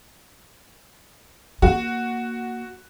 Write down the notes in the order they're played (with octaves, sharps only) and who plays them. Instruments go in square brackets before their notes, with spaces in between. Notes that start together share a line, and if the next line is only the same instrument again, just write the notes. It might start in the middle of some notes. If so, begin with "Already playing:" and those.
[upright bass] A#3 [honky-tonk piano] F#4